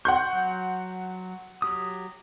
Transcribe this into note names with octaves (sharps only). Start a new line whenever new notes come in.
F#5 C6 C#6 G6
F#3
F#3 G4 D#6